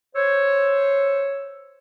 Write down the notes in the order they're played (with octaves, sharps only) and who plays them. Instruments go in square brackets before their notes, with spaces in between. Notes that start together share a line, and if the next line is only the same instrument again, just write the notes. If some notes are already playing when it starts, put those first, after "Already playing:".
[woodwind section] C5 C#5 E6